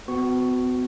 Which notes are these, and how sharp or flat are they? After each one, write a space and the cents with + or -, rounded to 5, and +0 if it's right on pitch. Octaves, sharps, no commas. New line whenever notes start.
B3 +40 F#4 +0 C#6 +0